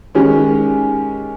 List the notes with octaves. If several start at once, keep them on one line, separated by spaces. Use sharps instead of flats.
D#3 G#3 C#4 G4